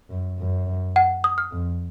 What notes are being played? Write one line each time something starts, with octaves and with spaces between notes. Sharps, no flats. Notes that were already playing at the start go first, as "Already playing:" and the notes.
F#2
F#2
F#5
D#6
F6
F2